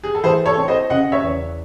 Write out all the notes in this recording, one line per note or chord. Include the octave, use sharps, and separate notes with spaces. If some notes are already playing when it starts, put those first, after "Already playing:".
G#4
A4
E3 G#4 C5
A4 C#5
C4
C5 D#5
C#3 D#5 F#5
C#5 E5
E2